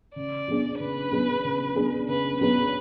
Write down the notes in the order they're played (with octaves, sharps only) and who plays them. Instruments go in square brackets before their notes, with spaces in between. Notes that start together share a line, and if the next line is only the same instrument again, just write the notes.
[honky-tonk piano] C#3 [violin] D5
[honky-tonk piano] F#3 B3 D4 G#4
[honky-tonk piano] C#3 [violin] B4
[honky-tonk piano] F#3 B3 D4 G#4
C#3
F#3 B3 D4 G#4
[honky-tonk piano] C#3 [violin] B4
[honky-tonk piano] F#3 B3 D4 G#4 [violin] B4